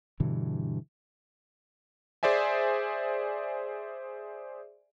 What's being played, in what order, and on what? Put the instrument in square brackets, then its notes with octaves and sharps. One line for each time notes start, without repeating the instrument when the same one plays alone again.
[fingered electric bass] G2 B2 D3 E3
[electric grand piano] G#4 C5 D5 E5 G#5